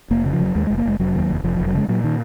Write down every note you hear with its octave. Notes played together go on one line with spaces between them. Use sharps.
F1 A#3
C#3
F3
F1 F#3
D#2 G#3
G#3
F1
A#3
F1 G#3
F1 F#3
D#2
F1
F1 F3
F3
F1
F#3
C#3 G#3
A#2 F#3
D#3